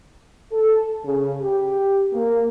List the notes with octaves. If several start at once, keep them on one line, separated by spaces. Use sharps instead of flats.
A4
C#3
G4
A#3